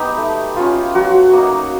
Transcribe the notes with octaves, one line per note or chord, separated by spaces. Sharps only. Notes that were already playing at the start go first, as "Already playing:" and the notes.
Already playing: B3 D#4 G4
A3
C#4 F4
F#3 F#4
A#3 D#4